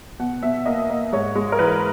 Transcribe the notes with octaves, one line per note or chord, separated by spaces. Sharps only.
B2 F#5
B2 E5
A#3 D#5
A#3
G#2 C#5
G#3
A#4
E3 B4